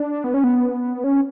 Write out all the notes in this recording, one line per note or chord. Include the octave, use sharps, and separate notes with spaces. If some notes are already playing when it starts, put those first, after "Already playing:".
Already playing: D4
B3
C#4
B3
C#4